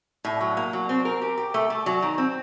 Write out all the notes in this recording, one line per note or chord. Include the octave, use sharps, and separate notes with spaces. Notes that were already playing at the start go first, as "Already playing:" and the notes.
A2
F#3
A#3
F#3
C4
A#4
G4
G4
A3
A3
F#3
D#3
C4